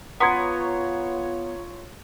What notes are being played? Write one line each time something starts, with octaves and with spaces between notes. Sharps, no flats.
B3 F4 C#5 A#5 C6 G#6